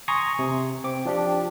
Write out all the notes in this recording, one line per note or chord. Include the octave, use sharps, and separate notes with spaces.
G#5 A#5 C6 C#6 D#6
C3
C4 D6
F3 D4 G4